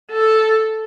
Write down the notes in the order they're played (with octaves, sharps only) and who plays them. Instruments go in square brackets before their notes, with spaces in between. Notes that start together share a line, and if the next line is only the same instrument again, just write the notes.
[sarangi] A4